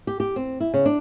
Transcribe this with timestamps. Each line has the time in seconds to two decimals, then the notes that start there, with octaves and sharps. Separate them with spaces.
0.07 G4
0.20 G4
0.36 C4
0.60 E4
0.74 C#3
0.86 D4